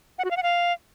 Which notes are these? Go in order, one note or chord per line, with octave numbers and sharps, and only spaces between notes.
F#5
F#4
F5
F#5
F5